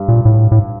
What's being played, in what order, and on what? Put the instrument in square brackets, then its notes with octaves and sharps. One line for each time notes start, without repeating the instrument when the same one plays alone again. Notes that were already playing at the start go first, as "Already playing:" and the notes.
Already playing: [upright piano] G2
[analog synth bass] A#2
A2
A2